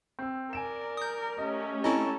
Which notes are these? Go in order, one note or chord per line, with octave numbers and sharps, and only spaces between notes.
C4 E6
A#4 D5 G#5 D7 E7
D#6 G6
A3 C#4 G4 D#5
C4 E4 A4 D#5 G#5 A#5 C#6